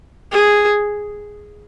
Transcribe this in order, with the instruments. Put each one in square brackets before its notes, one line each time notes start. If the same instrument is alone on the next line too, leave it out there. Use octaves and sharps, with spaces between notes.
[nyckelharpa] G#4